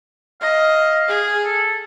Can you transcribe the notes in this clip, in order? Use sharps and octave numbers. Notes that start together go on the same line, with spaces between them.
D#5 F5
G#4
A4